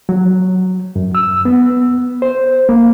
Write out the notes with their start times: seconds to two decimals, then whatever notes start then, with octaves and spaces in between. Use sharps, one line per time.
0.09 F#3
0.96 F#2
1.15 E6
1.45 B3
2.22 C5
2.69 A#3